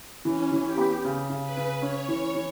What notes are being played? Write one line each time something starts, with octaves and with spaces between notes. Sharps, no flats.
E3 C#4
E3
G4
B3
C#3
C#3
B4
C#3
C#4 C#5
E3
E3